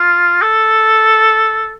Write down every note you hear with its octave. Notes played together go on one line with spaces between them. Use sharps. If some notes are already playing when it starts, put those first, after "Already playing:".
Already playing: F4
A4